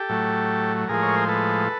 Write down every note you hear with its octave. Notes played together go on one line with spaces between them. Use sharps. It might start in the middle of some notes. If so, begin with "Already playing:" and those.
Already playing: G4 A4
A2 F#3 A3
A2 F3 G#3 G#4 A#4
C#5
C5
A4 B4